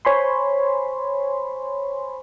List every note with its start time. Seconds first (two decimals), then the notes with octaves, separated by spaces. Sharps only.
0.05 C5 C#5 G#5 B5 C6